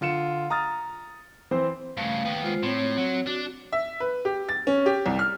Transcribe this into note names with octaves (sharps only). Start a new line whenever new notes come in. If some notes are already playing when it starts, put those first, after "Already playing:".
D3 F4 C#7 E7
A#5 D#6 F6 A6
E3 C4 C5
G2 C#3 A3 F5
D#2 B3 G5
G#3 F4 C5
A2 C4 C#5
F#3
D4 F#4
E5
B4
G4
A6
C#4
G4
C2
F6